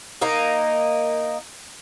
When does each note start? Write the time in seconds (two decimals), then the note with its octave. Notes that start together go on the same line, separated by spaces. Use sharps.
0.22 A#3 D#4